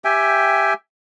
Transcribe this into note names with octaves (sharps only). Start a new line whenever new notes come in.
G4 E5 G5 G#5